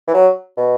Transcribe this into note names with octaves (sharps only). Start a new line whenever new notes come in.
E3
F#3
B2